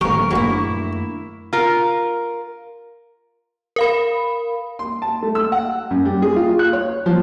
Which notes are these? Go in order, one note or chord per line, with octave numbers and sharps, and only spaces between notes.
A1 D#2 F#3 A#3 G4 A#4 C#6
A#1 F#2 F#3 A3 A#3 D4 E4
F4 A#4
A#4 F5 B5
C6
A5
A3
E6
F#5
F#2
G3
G#4
F4
F#6
C#5
F3